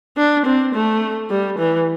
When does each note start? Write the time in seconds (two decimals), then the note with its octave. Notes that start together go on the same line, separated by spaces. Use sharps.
0.18 D4
0.46 C4
0.74 A3
1.30 G3
1.59 E3